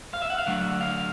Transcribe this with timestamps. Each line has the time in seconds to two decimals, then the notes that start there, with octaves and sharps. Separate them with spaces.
0.14 F5
0.22 E5
0.30 F#5
0.38 F5
0.46 D3 F#3 A3 F#5
0.81 F5